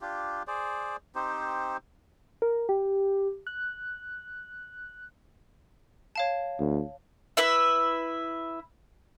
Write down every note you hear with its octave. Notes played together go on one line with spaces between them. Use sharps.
D4 F4 G4
G#4 C5 D5
C4 D#4 G4 C5
A#4
G4
F#6
C#5 F5 A5
D2
E4 B4 E5